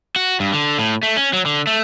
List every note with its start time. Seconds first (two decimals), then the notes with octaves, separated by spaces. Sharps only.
0.16 F#4
0.40 G2
0.53 D3
0.79 A2
1.03 A3
1.17 C#4
1.33 F#3
1.46 D3
1.67 A3